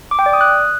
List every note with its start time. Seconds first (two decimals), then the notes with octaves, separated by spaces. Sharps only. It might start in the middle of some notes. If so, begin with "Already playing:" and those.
0.11 D6
0.19 G5
0.26 D5
0.33 D#6
0.41 F#6